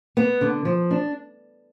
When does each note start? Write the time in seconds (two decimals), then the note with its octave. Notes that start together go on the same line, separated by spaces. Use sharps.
0.17 B3
0.41 D3
0.65 F3
0.91 D4